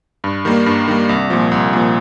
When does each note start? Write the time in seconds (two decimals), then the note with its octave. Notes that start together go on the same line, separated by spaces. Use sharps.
0.24 G2
0.45 D#3 G3 A#3
0.66 G2
0.88 D#3 G3 A#3
1.09 C2
1.30 A#2 F3
1.52 C2
1.73 A#2 F3